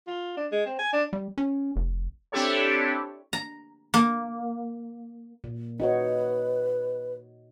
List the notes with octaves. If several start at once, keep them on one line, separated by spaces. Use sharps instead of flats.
F4
D4
G#3
C4
G#5
D4
G3
C#4
F1
C4 D4 E4 G4 A4 C#5
A#5
A#3
A#2
D#4 F#4 B4 C#5